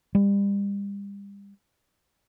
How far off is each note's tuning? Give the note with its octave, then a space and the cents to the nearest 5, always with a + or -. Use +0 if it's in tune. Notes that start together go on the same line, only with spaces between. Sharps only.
G3 +35